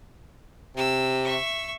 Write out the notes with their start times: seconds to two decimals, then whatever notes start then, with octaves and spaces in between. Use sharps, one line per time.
0.77 C3 E6
1.24 E5 C#6